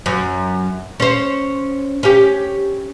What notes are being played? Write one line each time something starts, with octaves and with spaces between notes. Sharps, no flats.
F#2
C#4 C5
C#4 G4